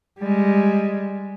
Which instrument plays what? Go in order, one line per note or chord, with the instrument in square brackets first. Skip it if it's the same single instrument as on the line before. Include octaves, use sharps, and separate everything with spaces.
[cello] G3 G#3